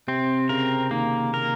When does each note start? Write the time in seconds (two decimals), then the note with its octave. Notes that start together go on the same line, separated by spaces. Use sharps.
0.08 C3 C4
0.49 C#3 A#4
0.91 D#3 A#3
1.34 A#4